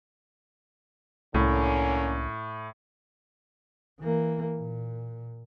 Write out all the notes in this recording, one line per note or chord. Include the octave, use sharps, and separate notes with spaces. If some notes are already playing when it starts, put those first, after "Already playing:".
C2 A2 D3 A#3 C#4
E3 A#3
A#2